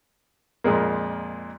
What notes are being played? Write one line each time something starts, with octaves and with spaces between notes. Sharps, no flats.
F2 A#2 G#3 A#3